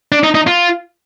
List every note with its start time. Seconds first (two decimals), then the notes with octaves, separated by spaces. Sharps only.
0.12 D4
0.24 D#4
0.35 D#4
0.47 F4